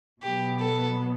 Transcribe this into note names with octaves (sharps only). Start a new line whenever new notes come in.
B2 F#3 B3 G4
A4